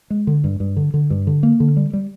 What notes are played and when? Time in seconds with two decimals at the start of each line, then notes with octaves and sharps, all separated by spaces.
0.10 G#3
0.27 D3
0.44 G2
0.60 G2
0.77 D3
0.94 D3
1.10 G2
1.27 D3
1.43 A#3
1.60 D3
1.77 G3
1.93 G3